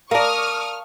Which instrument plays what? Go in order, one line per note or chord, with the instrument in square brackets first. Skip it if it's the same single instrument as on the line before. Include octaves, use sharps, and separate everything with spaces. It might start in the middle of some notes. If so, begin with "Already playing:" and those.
[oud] A#4 D5 [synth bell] F5 A5 [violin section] C#6 D#6 F6